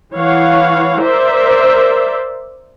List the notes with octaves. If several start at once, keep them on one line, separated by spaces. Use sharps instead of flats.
E3 C#5 F5 F#5
A#4 C5 D5 E5